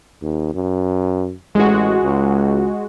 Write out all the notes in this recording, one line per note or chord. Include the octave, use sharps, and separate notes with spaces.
D#2
F#2
A1 G#3 F#4
C#2